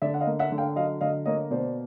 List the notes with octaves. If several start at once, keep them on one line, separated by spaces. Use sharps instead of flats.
D3 D5 E5
F#5
D#5 F5
A#3
E5 F#5
D3
F5 G5
F#3 D#5 F5
D3 D#5 F5
A#3 C#5 D#5
B2 C5 D5